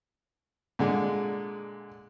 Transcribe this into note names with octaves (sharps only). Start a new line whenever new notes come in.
A#2 D3 G#3